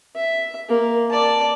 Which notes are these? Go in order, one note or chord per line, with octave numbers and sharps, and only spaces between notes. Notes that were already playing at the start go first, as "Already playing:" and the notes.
E5
A#3
D5 A5